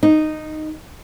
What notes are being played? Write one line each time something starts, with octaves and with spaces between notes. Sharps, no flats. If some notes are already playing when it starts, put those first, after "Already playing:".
D#4